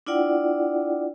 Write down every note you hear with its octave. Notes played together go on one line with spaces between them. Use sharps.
D4 E4 F4 D5 F#5 G5